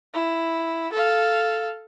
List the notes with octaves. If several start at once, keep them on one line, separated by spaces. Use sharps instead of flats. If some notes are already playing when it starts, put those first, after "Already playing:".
E4
A4 F5